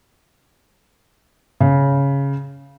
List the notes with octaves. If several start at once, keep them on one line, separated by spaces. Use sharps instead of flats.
C#3